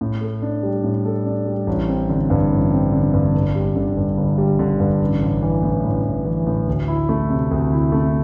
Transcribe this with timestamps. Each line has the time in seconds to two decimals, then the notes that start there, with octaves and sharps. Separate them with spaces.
0.01 A2
0.21 A4
0.42 D4
0.63 G3
0.84 A2
1.05 A4
1.26 D4
1.47 G3
1.67 A1
1.89 C4
2.09 D3
2.30 G2
2.51 A1
2.71 C4
2.92 D3
3.14 G2
3.35 G1
3.55 G3
3.76 D3
3.97 G2
4.17 G1
4.38 G3
4.59 D3
4.80 G2
5.01 A1
5.21 A1
5.42 E3
5.63 A2
5.84 A1
6.04 A1
6.25 E3
6.47 A2
6.67 D2
6.88 E4
7.09 A3
7.30 C3
7.51 D2
7.72 E4
7.92 A3